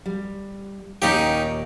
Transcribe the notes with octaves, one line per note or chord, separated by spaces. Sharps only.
G3
D#2 A#2 C#4 D#4 G4 D#5